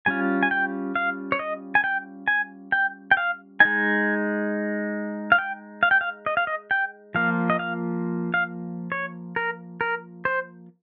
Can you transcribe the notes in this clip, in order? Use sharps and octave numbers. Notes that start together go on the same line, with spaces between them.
G3 C#4 F4 G#5
G#5
G5
F5
C#5
D#5
G#5
G5
G#5
G5
G5
F5
G#3 D#4 G#5
F5
G5
F5
G5
F5
D#5
F5
D#5
G5
F3 A#3 F4 F5
D#5
F5
F5
C#5
A#4
A#4
C5